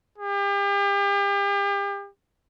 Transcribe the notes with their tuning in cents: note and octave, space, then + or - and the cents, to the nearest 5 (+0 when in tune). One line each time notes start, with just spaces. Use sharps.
G4 +40